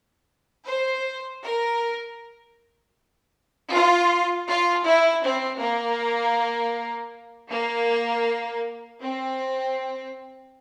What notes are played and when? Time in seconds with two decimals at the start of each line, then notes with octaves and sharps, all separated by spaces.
0.67 C5
1.43 A#4
3.71 F4
4.48 F4
4.86 E4
5.23 C4
5.60 A#3
7.50 A#3
9.02 C4